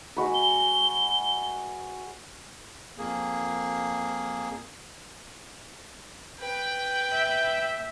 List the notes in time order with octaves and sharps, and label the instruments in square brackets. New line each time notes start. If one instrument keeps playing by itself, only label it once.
[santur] G#3 F#4 B4
[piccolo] G7
[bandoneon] F2 A#3 G#4
[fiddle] B4 G5 [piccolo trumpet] G6
[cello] E5